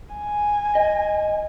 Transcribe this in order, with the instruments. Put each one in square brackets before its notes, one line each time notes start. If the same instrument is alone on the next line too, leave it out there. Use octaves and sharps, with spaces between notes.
[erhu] G#5
[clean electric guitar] D#5